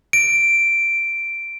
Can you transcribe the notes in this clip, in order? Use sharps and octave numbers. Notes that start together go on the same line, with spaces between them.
D7